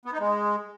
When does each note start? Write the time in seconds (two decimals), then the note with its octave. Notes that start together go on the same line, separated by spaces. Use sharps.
0.05 B3
0.13 D#4
0.20 G#3